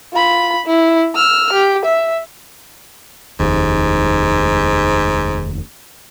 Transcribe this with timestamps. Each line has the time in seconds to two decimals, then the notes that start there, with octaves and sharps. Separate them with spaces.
0.13 F4 B5
0.66 E4
1.16 E6 F6
1.53 G4
1.85 E5
3.40 F1 D#2 G#2